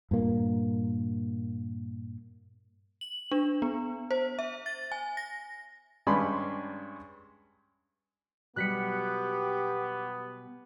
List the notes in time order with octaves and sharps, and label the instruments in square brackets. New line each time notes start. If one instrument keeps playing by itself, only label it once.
[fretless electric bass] G2 A#2 A#3
[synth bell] F#7
D4
B3
C5
E5
A6
G#5
A#6
[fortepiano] G2 G#3 C#4 D5 B5 C6
[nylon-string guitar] B2 F#3 G3 [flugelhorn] B3 [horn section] G4 [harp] F#6 B6 C#7